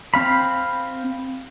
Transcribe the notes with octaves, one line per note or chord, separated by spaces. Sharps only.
C4 F5 B5